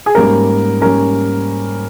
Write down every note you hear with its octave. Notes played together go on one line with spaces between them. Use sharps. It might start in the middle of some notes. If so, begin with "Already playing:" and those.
G#4
G#2 G3 A#3 C#4 A#4
G3 A#3 C#4 A#4